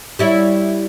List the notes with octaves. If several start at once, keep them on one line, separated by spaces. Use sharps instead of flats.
G3 E4 C#5